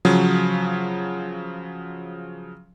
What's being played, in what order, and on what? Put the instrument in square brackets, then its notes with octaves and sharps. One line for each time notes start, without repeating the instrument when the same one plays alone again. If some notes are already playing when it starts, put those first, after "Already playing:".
[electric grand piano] C#3 F3 F#3